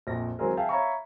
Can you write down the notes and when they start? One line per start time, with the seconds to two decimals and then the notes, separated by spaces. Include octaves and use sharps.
0.07 A#1 F2 A#6
0.39 E3 F#3 G#3 C4 G#4 A#4
0.57 G#4 E5 F5 G5 A5
0.69 C#5 E5 F5 A#5 B5 C#6